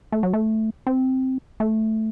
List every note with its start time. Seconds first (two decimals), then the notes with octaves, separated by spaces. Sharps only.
0.12 A3
0.23 F#3
0.33 A3
0.87 C4
1.60 A3